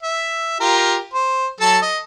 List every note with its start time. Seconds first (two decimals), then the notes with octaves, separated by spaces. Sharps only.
0.03 E5
0.60 F4 G4 A#4
1.14 C5
1.60 F#3 A4 A5
1.82 D#5